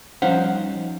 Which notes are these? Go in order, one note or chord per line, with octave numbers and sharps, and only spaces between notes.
F3 G3 C#4 D#4 C5 F5 F#5